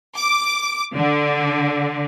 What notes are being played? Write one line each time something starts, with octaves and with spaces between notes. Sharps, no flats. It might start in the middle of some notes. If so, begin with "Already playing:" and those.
D6
D3